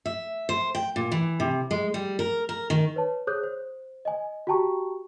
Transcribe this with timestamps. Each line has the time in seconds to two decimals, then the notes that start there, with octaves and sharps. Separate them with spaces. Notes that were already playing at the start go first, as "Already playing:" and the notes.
0.06 E5
0.49 C5
0.75 G5
0.96 A#2
1.12 E3
1.40 C3
1.71 G#3
1.94 G3
2.19 A#4
2.49 A#4
2.70 D#3
2.96 B4 C#5 A5
3.27 G#4 C5 C#5 D#6 F#6 G6
3.43 C5
4.05 D#5 G#5
4.47 F#4 G4 G5 A5 A#5 C#6